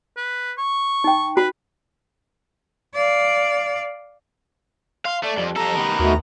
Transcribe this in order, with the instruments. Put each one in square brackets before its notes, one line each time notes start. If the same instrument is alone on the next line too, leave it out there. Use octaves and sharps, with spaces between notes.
[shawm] B4
C#6
[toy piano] D#4 G5
[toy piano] F#4 B5 [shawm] B4
[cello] D5 F5
[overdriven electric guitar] F5 [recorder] C6
[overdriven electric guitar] A3 [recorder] D5
[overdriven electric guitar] F2 [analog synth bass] G3
[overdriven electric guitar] F2 A4 [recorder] A#5
[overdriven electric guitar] D#3 B3
[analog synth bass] D#2 [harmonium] A3 D#4 F#4